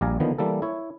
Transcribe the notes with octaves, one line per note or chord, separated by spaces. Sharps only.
A#1 G3 D5 F5 G#5 A#5
D3 D#3 F3 B3
E3 G3 A#3 A4
E4 C#5